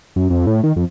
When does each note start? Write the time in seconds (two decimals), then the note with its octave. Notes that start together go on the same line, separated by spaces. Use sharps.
0.16 F#2
0.30 F2
0.47 A2
0.63 D#3
0.76 F2